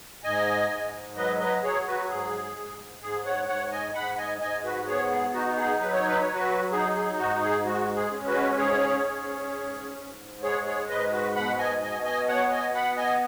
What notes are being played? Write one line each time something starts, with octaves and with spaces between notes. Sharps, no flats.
G#2 D#5 G#5
G#2
F#3 B4 D#5
B4 D#5
F#3 G#4 C#5
F#4 B4
G#2 G#4
G#2
G#2 G#4
C#5 F#5
G#2 C#5 F#5
D#5 G#5
G#2 F#5 B5
D#5 G#5
G#2 D#5 G#5
F#4 B4
B3 G#4 C#5
G#4
D#4 F#4
G#4
F#3 B4
C#5
B4
C#5
F#3
F#4 B4
D#4 G#4
G#4
G#2 F#4
G#4
G#3 F#4
G#4
C#4
F#4 B4
G#2 G#4 C#5
C#4
G#2
G#2
G#3 G#4 C#5
G#4 C#5
G#2 B4 D#5
F#4 B4
B2 F#5 B5
D#5 G#5
B2 D#5 G#5
D#5 G#5
B3 C#5 F#5
D#5 G#5
B3 F#5 B5
D#5 G#5